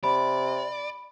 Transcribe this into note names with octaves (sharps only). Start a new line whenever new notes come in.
C3 D5 B5